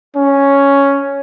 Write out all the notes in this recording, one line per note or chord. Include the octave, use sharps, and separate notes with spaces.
C#4